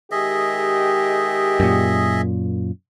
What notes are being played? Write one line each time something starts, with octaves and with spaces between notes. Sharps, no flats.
D#3 G#3 G4 G#4 D#5 E5
F#2 A#2